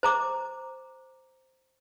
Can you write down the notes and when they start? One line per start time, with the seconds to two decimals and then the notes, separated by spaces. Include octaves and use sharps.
0.03 C5 A#5 D6